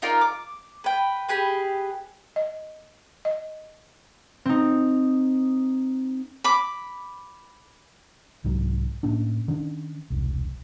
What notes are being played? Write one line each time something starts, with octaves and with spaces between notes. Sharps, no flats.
D#4 F4 A#4 D5
D6
B4 G5
G4 G#4 B4
D#5
D#5
C4 D#4
B5 D6
C2 G#2 F#3
A2 A#3 C#4 D4
D#3 C#4 D4
E1 C2